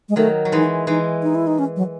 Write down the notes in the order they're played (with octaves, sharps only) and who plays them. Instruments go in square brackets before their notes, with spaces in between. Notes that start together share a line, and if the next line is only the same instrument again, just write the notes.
[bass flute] G#3
[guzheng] D#3 F#3 [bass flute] A3
[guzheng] F#3
[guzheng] E3 G#3 [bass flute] D#4
[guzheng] E3 G#3 [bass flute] D#4
[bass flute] D#4
E4
D#4
C#4
F#3